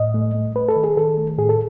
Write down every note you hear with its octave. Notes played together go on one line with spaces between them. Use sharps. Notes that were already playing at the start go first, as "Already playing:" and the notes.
Already playing: A2 D#5
A3
A3
A3 B4
A4
D#3
G#4
D#3 A4
A3
A2 G#4
A4